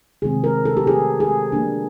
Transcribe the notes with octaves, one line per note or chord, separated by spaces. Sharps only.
C3 D#3 G#3 C4 G#4
A#4
A4
G4
G#4
G#4
F3 A#3 D4